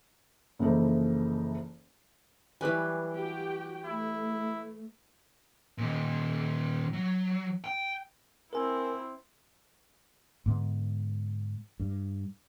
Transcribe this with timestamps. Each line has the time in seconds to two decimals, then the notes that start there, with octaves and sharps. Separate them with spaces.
0.59 F#1 E3 F3 D#4 A4
2.61 E3 F#3 G3 B4 G#5
3.13 F#4 G4 G5
3.86 A3 E4
5.78 A#2 D#3
6.94 F#3
7.64 G5
8.53 C4 E4 A#4 G#5
10.46 G#2 D3 B3
11.80 G2